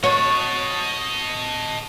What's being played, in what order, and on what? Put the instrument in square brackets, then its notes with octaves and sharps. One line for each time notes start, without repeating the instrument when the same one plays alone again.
[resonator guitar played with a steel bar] F#4 [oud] C#5 [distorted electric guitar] D#5 A5